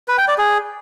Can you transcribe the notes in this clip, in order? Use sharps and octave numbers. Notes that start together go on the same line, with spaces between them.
B4
G5
D5
G#4